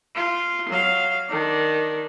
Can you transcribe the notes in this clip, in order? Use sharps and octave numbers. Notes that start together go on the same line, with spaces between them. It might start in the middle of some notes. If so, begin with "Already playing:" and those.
F4
F#3 F5
D#3 D4